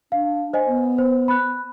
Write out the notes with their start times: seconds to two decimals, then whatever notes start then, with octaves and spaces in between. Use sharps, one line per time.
0.12 D4 F5
0.53 C5 D#5 G#5
0.67 B3
0.98 C5
1.28 B5 F#6